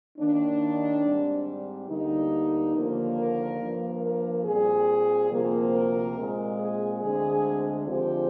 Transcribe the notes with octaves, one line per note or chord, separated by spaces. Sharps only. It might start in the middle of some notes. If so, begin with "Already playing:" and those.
D#2 D#3 A#3 D4
G#2 G3 C4
D2 D3 G3 A#3 D#4
D#2 D3 F3 A#3
A#4
G2 F3 A#3
A#4
A#2 G3 C4 G#4
D2 C3 F3 A#3
A#4
A#2 G#3 C4
G#4
D2 D3 G#3 C4 G#4
F2 D3 F3 G#3 C4 G4